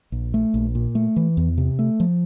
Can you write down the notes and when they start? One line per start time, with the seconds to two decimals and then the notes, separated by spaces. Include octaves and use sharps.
0.12 A#1
0.34 A3
0.54 A#1
0.75 A#2
0.95 A3
1.16 E3
1.37 E2
1.58 C3
1.79 A3
2.00 F3